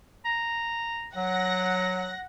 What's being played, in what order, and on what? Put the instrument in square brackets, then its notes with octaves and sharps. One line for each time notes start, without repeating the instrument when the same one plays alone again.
[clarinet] A#5
[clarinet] F#3 [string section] F#5 A#6